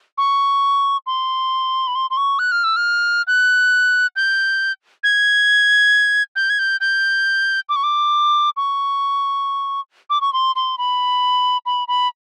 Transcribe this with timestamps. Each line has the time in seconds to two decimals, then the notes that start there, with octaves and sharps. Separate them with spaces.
0.18 C#6
1.07 C6
1.87 B5
1.95 C6
2.10 C6
2.17 C#6
2.39 F#6
2.52 F6
2.64 E6
2.76 F6
3.27 F#6
4.16 G6
5.04 G#6
6.36 G6
6.50 G#6
6.59 G6
6.81 G6
7.69 D6
7.76 C#6
7.83 D6
8.57 C#6
10.10 D6
10.21 C#6
10.33 C6
10.56 C6
10.78 B5
11.66 B5
11.88 B5